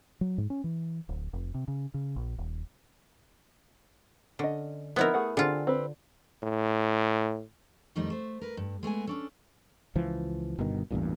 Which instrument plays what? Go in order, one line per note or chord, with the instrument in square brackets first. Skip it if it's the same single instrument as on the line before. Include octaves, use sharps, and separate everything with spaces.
[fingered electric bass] F#3
G#2
C#4
E3
D1
F1
C3
C#3
C#3
A#1
D#1
[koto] D3 [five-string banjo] C#4 D#5
[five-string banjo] F3 C4 D#4 [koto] B3 E4 A#4
[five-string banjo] A3 G#4 F#5
[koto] D3 F4 [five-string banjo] C4 G4 G#4
[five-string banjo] C4 B4
[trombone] A2
[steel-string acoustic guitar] F2 D#3 G3 A3 D#4
A3 C5
A#4 B4
G2
G#3 A3 B3 G#5
C#4 D4 A4
[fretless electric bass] C#2 E3 F3
G1 G2 B2 D#3
A1 E2 G2 A#2